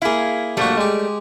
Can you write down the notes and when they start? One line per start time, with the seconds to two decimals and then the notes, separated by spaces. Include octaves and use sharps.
0.02 A#3 E4 G#4 F5
0.57 A#1 G3 A3 A#3 F#4
0.77 G#3 G4